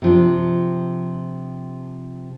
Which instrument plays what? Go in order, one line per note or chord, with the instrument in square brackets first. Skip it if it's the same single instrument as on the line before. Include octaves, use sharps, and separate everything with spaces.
[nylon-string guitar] C3 F3 D4